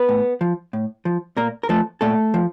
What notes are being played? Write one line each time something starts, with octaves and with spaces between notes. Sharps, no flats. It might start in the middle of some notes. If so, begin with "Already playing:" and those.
Already playing: B3 B4
A2
F3
A2
F3
A#2 A#3 A#4
A#4
F3 A3 A4
A#2 A3 A4
F3